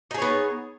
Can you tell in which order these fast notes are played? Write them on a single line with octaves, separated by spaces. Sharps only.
D#4 G#4 C#5 B3